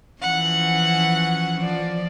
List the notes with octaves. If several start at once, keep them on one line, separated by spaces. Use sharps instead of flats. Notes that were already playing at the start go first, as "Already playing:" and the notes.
E3 F3 C#4 F#5
F3 D5